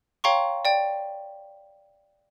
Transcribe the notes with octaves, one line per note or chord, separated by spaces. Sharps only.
C#5 F5 G5 A#5 C6 C#6
D5 G5